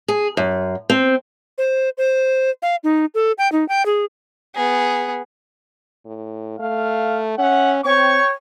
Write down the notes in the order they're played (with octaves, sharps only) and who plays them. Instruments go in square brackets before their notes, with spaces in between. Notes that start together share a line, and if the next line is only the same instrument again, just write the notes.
[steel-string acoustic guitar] G#4
F#2
C4
[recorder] C5
C5
F5
D#4
A4
G5
D#4
G5
G#4
[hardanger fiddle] B3 G#4
[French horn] A2
[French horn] A3 [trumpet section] F5
[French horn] C#4 [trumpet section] E5 F#5
[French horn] C4 [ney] C#5 [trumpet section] G5 C#6